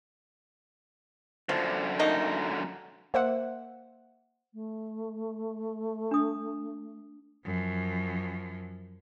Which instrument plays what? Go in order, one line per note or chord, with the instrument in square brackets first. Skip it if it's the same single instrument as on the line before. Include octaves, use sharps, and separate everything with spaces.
[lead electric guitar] F#2 D3 [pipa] F3
[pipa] A3 A#3 D#4
[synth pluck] A#3 C5 E5 F#5
[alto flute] A3
[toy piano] D4 D#6
[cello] F#2 F3